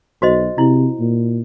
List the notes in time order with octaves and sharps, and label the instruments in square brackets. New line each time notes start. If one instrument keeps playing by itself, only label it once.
[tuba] B1 [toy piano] F#4 C5 D#5
[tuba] C3 [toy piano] E4
[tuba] A#2